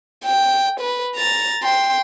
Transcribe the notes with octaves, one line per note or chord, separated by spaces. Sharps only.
G5
B4
A#5 A6
G5 C6